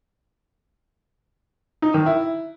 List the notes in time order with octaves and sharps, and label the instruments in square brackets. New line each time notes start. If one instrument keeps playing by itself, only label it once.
[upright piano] D#4
D#3
E4